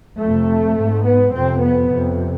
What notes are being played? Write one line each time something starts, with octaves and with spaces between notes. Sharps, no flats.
F2 C3 A3
G#2
B3
F2 C3 C4
B3
F2 C3